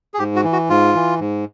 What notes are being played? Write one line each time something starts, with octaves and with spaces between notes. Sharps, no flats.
G#4
G#2 G4
F#4
E3
F#4
G#2 F4
E3
G#2